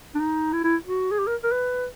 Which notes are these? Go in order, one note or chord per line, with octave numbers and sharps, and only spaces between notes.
D4
D#4
E4
E4
F#4
G#4
G4
A#4
A#4
B4